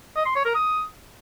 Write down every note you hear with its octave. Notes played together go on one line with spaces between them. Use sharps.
D#5
C6
C#5
A#4
D#6